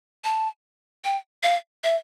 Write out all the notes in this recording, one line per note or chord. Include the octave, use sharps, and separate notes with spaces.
A5
G5
F5
E5